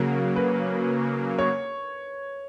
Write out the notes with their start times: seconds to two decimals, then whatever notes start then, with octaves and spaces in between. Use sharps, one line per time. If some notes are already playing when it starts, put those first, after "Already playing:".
Already playing: C#3 F#3 A#3 A#4
0.36 B4
1.39 C#5